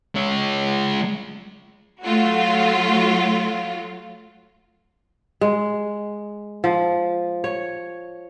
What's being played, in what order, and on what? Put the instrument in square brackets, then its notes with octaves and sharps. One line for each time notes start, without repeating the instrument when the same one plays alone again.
[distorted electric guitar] G#3 C#5
[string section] F#3 A3 F4 F#4
[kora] G#3
F3
C#5